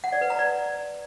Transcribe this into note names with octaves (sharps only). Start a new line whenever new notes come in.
F#5
D5
B4
A#5
D5